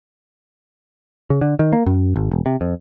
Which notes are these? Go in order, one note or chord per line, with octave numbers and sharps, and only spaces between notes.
C#3
D3
D#3
A#3
F#2
G#1
E1
C3
F2